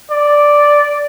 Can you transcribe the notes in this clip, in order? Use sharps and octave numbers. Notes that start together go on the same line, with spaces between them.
D5